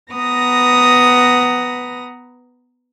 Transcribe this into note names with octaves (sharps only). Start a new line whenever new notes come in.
B3 B4 F#5 A#5 D#6 A#6